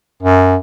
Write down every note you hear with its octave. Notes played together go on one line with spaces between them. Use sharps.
F#2